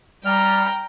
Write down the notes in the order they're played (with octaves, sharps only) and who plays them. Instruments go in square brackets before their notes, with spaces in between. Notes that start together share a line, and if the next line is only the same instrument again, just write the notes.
[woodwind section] G3 F6 [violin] G5 A#5